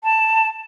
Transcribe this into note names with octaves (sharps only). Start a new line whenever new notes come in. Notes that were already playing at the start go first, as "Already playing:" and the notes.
A5